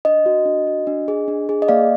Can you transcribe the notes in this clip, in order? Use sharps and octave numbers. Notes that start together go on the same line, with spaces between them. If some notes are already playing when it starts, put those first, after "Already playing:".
D4 D#5
F#4
D4
F#4
D4
G#4
D4
G#4
D#5
A#3 D5 F5